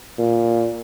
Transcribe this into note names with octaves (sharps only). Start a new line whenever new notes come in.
A#2